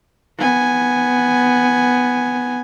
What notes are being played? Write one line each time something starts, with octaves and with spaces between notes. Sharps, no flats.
B3 G#5